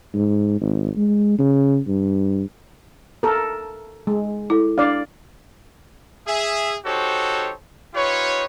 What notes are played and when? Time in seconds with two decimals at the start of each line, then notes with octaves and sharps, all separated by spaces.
0.14 G#2
0.61 G#1
0.96 G#3
1.39 C#3
1.87 G2
3.23 A4 A#4
4.07 G#3
4.50 E4 A4
4.78 D4 D5 F5
6.27 G#4 E5
6.85 D#4 F#4 G4 A4 C5 C#5
7.94 D#4 F4 G4 B4 C#5